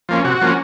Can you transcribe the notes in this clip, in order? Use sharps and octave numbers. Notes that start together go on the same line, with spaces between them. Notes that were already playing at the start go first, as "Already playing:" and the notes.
F3 A#3 C#4
C3 F#4
F3 A#3 C#4